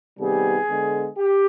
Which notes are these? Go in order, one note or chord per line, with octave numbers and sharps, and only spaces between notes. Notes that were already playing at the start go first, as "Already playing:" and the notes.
C3 D#3 G3 B3 G#4
D3 G#3 B3
G4